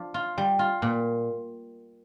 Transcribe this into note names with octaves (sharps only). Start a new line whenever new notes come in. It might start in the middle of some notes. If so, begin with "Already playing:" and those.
Already playing: F3 D4
F4
G3
F4
A#2